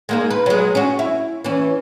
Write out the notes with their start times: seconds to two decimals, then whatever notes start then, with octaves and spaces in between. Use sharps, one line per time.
0.09 G#3 A#3 D#4
0.30 B4
0.46 F#3 G#3
0.75 C#4 F#4
0.99 E4
1.44 E3 C#4